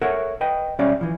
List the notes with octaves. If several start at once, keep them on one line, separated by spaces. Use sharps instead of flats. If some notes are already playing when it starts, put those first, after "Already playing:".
A4 A#4 C#5 E5 F#5
B4 D#5 G5
B1 G3 C#4 D5 E5 F5
E3 F3